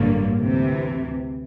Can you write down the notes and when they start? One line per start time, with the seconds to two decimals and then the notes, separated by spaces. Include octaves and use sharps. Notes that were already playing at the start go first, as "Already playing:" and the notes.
Already playing: A1 G2 D3 F#3 A#3
0.42 D2 C3 E3